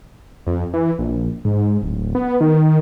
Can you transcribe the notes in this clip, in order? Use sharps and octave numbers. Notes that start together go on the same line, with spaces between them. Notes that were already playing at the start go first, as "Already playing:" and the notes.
F2
E3
A#1
G#2
D1
B3
D#3